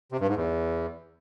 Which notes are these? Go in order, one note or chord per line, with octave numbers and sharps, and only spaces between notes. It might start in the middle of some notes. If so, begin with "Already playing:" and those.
C3
G2
G#2
E2